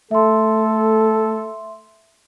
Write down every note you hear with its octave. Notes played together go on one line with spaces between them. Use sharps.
A3 A4 E5 C6